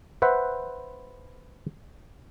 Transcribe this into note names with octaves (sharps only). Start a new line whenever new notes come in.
B4 C5 E5 F#5